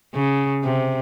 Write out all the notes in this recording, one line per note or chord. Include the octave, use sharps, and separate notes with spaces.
C#3
C3